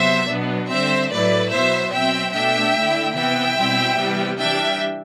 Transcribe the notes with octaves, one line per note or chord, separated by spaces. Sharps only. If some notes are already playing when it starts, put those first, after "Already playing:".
Already playing: C3 F#3 B3 C5 E5
B2 F#3 B3 D4
D3 G3 C4 C5 E5
A2 F#3 A3 E4 B4 D5
B2 F#3 B3 C5 E5
B2 F#3 C4 E5 G5
B2 A3 D4 E5 G5
D3 A3 E4
C3 E3 B3 E5 G5
B2 G3 C4 E4
C3 E3 G3 B3
E3 G3 D4 E5 G5